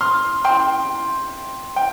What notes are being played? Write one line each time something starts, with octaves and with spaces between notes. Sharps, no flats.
C6 F6
G5 C6
G5